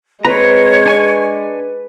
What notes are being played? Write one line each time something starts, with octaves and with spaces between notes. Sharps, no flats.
G#3 C4 B4 C#5 A#5
D4 G#5 C#6